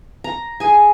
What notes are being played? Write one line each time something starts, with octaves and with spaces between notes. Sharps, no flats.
A#5
G#4 G#5